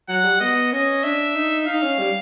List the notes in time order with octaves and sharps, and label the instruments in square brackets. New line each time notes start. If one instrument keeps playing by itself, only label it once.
[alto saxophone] F#3 [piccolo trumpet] F#5
[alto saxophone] G3
[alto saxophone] B3 [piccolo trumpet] D#5
[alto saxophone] C#4 [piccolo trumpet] D#5
[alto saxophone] D4 [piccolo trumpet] E5
[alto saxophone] D#4
[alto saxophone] D#4 [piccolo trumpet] F5
[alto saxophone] C#4
G3